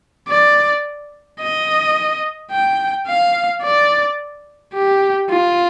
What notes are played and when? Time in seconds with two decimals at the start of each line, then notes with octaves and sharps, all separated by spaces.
0.29 D5
1.40 D#5
2.51 G5
3.07 F5
3.62 D5
4.74 G4
5.29 F4